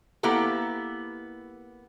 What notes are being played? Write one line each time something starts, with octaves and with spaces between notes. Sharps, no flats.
A#3 B3 E4 G4 A4